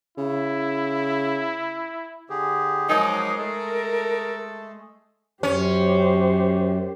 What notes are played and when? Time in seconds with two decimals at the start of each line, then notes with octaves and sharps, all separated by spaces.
0.18 C#3 E4
2.30 D3 G4 G#4
2.89 F3 F#3 G#3 D#4 G#4 A#4 D6
3.40 A3 A4
5.43 F#2 C#4 G4 C5